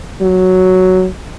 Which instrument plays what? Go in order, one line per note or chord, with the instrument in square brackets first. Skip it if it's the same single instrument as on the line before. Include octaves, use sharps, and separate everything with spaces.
[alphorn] F#3